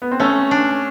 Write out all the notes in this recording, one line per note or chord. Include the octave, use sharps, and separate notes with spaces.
B3
C4
A3 C#4
D4